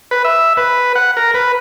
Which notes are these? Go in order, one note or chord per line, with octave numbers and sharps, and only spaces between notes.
B4
E5
B4
F#5
A#4
B4